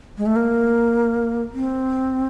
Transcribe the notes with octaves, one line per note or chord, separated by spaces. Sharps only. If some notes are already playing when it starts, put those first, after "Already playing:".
G#3
A3
A#3
C4